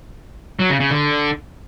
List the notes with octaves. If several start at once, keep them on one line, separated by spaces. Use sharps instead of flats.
F#3
C#3
C#3
D3